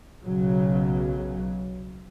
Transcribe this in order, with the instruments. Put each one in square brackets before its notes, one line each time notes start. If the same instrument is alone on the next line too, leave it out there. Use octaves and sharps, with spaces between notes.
[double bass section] B1 C#3 F#3